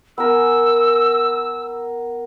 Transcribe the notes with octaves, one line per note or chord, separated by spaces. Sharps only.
B3 A#4 G#5 E6